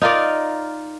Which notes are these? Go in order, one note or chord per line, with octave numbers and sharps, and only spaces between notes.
D#4 F4 A#4 D5